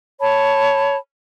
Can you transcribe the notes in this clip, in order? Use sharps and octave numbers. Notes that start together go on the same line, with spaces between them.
C#5 A5 B5